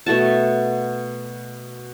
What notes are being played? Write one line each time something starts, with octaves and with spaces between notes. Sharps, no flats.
B2 A3 F#4 A5